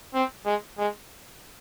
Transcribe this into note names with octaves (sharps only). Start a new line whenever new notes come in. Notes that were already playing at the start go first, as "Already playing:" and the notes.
C4
G#3
G#3